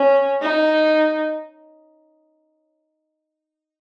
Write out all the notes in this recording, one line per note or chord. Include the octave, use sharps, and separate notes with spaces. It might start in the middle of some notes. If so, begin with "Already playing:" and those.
Already playing: C#4
D#4